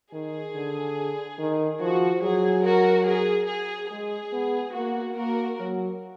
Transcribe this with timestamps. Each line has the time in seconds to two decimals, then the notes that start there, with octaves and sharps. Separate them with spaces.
0.13 D#3 G#4
0.55 D3
1.39 D#3
1.81 F3 F#4
2.23 F#3 G#4
2.65 F#4 A#4
3.07 G#4
3.49 G#4
3.91 G#3 G#4
4.33 B3
4.75 A#3 F#4
5.17 A#3 F#4 A#4
5.59 F#3